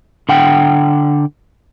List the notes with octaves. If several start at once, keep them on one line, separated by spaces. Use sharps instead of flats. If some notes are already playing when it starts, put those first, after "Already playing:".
D3 F#5 G5